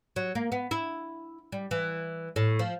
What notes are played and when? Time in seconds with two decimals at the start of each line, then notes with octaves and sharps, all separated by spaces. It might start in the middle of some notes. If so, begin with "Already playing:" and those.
0.16 F#3
0.35 A#3
0.52 B3
0.71 E4
1.52 G3
1.71 E3
2.36 A2
2.59 F3